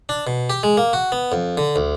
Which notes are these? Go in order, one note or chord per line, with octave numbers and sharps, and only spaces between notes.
D4
B2
G4
G#3
A#3
F#4
B3
F2
D3
D2